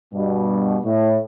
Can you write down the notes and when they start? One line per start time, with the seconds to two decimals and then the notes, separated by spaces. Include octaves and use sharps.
0.13 G2 B2
0.85 A2